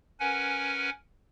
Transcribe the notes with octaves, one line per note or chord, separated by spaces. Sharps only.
C#4 A#4 B4 F#5 G#5